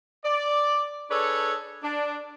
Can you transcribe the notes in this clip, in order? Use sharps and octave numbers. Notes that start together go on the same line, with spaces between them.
D5
D4 G#4 A4 B4 C#5
D4